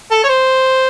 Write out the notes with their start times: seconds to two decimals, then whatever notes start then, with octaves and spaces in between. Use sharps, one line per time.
0.11 A4
0.24 C#5
0.29 C5